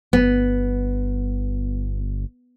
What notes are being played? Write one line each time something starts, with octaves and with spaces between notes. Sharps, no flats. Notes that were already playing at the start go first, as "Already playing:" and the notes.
G1 B3